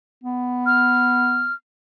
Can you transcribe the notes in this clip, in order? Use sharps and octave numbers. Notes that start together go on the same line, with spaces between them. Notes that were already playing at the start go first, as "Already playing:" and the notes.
B3
F6